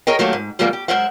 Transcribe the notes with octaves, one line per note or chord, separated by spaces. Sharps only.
G#4 A#4 C#5 D#5 G5
D#3 F#3 A3 A#3 G4 A4
G#2
D2 F3 G3 G#3 A#3 B3
G4
F#2 G#3 A#4 C5 E5 F#5